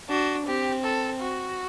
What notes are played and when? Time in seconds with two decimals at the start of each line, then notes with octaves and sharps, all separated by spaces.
0.09 D4 F#4
0.46 C4 G4
0.83 A4
1.21 F#4